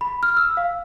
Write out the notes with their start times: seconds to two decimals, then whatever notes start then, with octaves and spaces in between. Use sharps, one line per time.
0.01 B5
0.23 F6
0.37 E6
0.57 F5